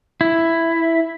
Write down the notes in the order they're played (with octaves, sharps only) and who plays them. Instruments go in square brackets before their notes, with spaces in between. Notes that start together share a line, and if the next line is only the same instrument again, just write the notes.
[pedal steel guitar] E4